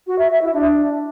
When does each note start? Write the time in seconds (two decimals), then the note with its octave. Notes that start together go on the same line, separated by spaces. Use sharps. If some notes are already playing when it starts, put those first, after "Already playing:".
0.07 F#4
0.18 E5
0.30 E5
0.42 E4
0.53 D4